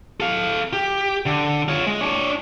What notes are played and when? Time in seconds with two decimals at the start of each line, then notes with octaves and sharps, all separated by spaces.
0.20 A4 F5
0.73 G4
1.26 D3
1.68 F4 C#5
1.87 G#3
2.01 D4 C#5